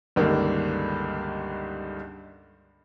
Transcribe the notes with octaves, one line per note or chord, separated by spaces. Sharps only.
C#2 G2 D3 D#3 A#3